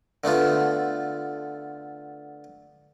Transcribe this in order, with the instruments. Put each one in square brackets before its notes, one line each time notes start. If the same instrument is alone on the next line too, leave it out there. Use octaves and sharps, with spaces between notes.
[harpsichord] D3 A3 B3 F4